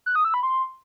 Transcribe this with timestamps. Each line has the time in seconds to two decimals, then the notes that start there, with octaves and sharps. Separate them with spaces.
0.06 F#6
0.15 D#6
0.25 E6
0.34 B5
0.43 C6